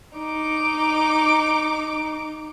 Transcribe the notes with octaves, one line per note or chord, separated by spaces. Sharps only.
D#4 D6